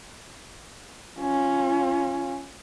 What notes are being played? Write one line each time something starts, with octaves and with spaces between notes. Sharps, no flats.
C#4 F4